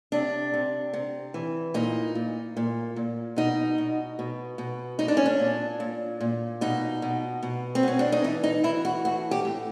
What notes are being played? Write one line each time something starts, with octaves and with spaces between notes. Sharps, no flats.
C3 D4
C3
C3
E3
A#2 D#4
A#2
A#2
A#2
B2 D#4
B2
B2
B2
A#2 D#4
D4
C#4
D4
A#2
A#2
A#2
B2 D#4
B2
B2
C4
B2 C#4
D4
D#4
E3 E4
D#4
E3 E4
F#4
A2 F#4
G4
A2